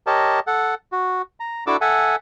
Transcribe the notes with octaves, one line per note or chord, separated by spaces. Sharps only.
G4 A#4 C#5 D#5 A5
A4 F#5
F#4
A#5
D4 E4 F#4 A4 D6 E6
A4 E5 F#5 G#5